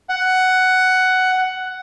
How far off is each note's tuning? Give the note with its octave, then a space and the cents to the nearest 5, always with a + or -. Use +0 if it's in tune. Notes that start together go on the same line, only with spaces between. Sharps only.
F#5 +10